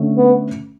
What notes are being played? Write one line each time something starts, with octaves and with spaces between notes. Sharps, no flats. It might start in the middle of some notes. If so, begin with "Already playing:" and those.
Already playing: D3 A3 C#4
B3